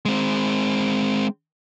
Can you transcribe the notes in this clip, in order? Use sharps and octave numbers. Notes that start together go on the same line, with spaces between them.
G#3 C4